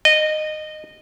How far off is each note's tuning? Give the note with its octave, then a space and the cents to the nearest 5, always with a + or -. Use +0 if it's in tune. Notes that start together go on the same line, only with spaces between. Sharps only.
D#5 -15